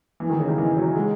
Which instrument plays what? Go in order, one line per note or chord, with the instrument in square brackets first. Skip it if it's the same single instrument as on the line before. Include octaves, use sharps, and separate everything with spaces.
[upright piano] E3
D#3
C#3
D#3
E3
F#3
G#3